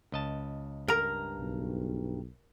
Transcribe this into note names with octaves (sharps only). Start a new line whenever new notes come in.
C#2 D#5 A5
G2 A#4 A#5
B1